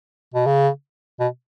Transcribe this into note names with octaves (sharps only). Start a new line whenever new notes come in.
B2
C#3
B2